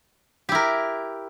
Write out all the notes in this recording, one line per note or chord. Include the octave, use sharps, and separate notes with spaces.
E4 G4 A#4